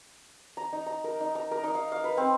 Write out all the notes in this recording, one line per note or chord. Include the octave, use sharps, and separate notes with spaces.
A#5
D#4
A#5
A#4
D#4
A#5
A#4
D#4
F5
F5
B4
C4